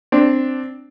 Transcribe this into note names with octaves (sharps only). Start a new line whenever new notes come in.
C4 D4